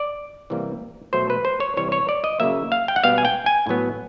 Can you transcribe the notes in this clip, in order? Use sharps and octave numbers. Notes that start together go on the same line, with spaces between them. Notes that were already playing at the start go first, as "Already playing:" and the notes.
Already playing: D5
C3 E3 G3 A#3
B2 F#3 A3 C5
B4
C5
C#5
C3 E3 G3 C#5
C#5
D5
D#5
C#3 F#3 A#3 E5
F5
G5
F#5
B2 G3 B3 F5
G#5
G5
G#5
A2 F#3 B3